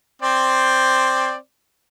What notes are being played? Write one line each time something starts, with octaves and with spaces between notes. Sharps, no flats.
C4 C5 D5